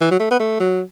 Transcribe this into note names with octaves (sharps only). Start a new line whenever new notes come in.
E3
F#3
A3
B3
A3
F#3